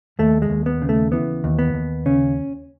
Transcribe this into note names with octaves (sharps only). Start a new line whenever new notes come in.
D#2 A3
G#3
D#2
B3
C#3
A3
E3 B3
D#2
B3
D#2
C#3 C#4